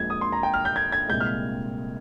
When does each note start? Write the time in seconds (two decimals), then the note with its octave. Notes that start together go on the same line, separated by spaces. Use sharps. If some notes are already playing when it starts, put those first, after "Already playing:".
Already playing: A#1 A#2 G#3 G#6
0.10 D#6
0.21 C6
0.32 A#5
0.43 G5
0.54 F6
0.65 G6
0.76 G#6
0.92 G#6
1.09 C2 A#2 G#3 G6
1.20 F6